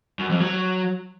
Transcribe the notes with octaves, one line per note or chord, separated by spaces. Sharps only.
F#2
F2
F#3